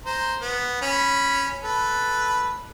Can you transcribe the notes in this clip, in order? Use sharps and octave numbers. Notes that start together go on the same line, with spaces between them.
C5 A#5
B3
C#4 B5
A4 B4